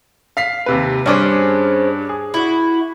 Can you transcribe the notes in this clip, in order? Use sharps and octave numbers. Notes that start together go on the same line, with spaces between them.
F5 B6 C7
D#2 C3 B4
G2 C#4 D4 G#4 C5 D6
G#4
E4 F#4